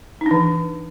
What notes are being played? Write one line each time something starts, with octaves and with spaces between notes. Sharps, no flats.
E3 D4 D#4